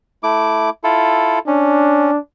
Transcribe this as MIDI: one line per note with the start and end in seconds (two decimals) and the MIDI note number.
0.23 0.70 57
0.23 0.70 64
0.23 0.70 86
0.84 1.39 64
0.84 1.39 65
0.84 1.39 69
1.47 2.11 61
1.47 2.18 62